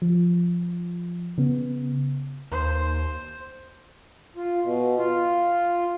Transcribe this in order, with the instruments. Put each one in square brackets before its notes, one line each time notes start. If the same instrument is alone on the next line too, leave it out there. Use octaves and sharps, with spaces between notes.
[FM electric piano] F3
C#3 B3
[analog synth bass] D#2 [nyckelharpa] C5
[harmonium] F4
B2
F4